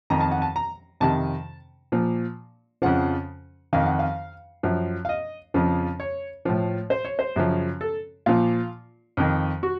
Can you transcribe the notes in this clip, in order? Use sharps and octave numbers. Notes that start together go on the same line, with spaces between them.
F2 D#3 A#5
A5
F#5
A5
A#5
F2 C3 D#3 A5
A#2 F3
F2 C#3 F3 F#5
F2 D#3 F5
F#5
F5
F#2 F3
F5
D#5
F2 C#3 F3
C#5
A2 F3
C5
C#5
C5
F#2 C#3 F3
A4
A#2 F3 F4
F2 D#3
F#4